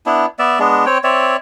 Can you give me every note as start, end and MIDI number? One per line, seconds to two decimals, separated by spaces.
0.06 0.26 59
0.06 0.26 62
0.06 0.26 64
0.39 0.59 59
0.39 0.59 74
0.39 0.59 76
0.59 0.85 56
0.59 0.85 59
0.59 0.85 62
0.86 0.98 60
0.86 0.98 73
0.86 0.98 79
1.04 1.37 60
1.04 1.37 73
1.04 1.37 74
1.04 1.37 76